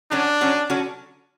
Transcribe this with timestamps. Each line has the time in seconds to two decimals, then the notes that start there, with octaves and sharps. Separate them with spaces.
0.11 D3 F#3 C#4 D4 F#4
0.41 D3 F#3 C#4 F#4
0.70 D3 F#3 C#4 F#4